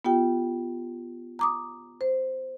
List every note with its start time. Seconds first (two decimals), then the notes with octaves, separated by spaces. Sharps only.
0.05 B3 F4 G4 G5
1.39 A#5 D6 D#6
2.01 C5